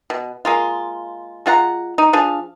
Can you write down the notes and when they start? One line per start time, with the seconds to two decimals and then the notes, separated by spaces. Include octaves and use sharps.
0.10 B2
0.45 G#3 A#3 F4
1.46 G#3 F4 F#5 A#5
1.98 D#4
2.13 F3 D4 G#4 F5